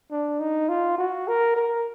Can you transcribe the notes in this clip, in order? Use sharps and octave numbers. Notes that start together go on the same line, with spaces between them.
D4
D#4
F4
F#4
A#4
A#4